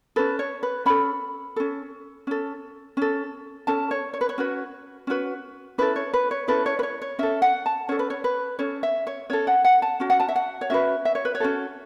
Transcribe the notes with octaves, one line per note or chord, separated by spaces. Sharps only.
C#4 A4 B4
C#5
B4
C#4 A4 B5
C#4 A4
C#4 A4
C#4 A4
C#4 A4 A5
C#5
C#5
B4
C#5
C#4 F#4 B4
C#4 F#4 B4
C#4 E4 A4 B4
C#5
B4
C#5
C#4 E4 A4 B4
C#5
B4
C#5
C#5
C#4 A4 E5
F#5
A5
C#4 A4 C#5
B4
C#5
B4
C#4 A4 C#5
E5
C#5
C#4 A4 C#5
F#5
F#5
A5
C#4 F#4
F#5
A5
E5
F#5
C#5
C#4 F#4 B4 E5
E5
C#5
B4
C#5
C#4 F#4 A4